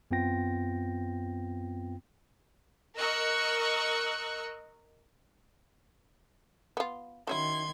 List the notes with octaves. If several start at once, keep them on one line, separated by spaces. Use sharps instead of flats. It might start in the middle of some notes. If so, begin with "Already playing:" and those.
F#2 B3 C4 F4 G5 A#6
A#4 D#5 C#6 E6 F#6
B3 F4
D#3 F#3 C#4 E4 C6 G#6